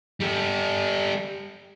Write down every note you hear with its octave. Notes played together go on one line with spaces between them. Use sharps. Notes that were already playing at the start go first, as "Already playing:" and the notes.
G3 A4